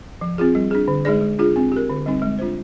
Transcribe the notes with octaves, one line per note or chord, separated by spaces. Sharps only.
F3
C4 F4 G#4
G3
D4 G#4
D3
G#3 D#4 G#4 D5
G#3
D4 F4 G#4
C4
G4 A#4
D3
G3 C4 D#4
G#3
D4 F4 C5